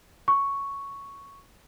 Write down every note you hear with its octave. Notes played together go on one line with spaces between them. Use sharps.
C#6